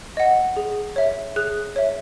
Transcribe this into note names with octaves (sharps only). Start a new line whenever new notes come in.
D#5 F#5
G#4
C#5 E5
G#4 F#6
C#5 E5